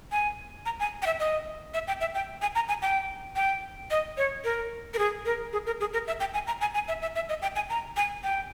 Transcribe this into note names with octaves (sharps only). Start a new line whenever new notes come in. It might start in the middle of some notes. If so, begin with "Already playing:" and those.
G#5
A#5
G#5
G5
E5
D#5
E5
G5
E5
G5
G#5
A#5
G#5
G5
G5
D#5
C#5
A#4
A#4
G#4
A#4
G#4
A#4
G#4
A#4
E5
G5
G#5
A#5
G#5
G#5
E5
E5
E5
D#5
G5
G#5
A#5
G#5
G5